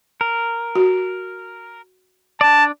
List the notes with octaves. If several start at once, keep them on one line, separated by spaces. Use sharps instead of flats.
A#4
F#4
D4 D5 A5